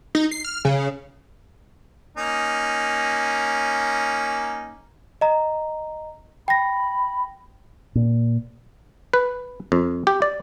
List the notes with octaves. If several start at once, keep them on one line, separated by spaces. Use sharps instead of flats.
D#4
C7
F6
C#3
A#3 C#4 D#4
D#5 A#5
G5 B5 A#6
A#2
B4
F2
G4
D5